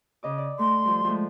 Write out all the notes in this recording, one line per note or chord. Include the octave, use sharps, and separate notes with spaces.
C#3 D#5 D6
D5
A3 C6
F3 G3
F3 G#3 A3